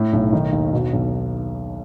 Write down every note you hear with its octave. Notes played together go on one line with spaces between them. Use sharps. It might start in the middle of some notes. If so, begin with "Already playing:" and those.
Already playing: A2
B1
D#3
D#2
B2
B1